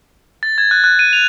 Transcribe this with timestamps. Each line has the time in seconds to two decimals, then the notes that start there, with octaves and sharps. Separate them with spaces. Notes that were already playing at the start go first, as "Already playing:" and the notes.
0.43 A6
0.58 G#6
0.71 F#6
0.84 F#6
0.99 D#7
1.13 F7